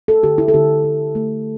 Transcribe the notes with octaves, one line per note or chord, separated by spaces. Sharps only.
A4
D3 G4
E4
A4
D3 G4
D3
A3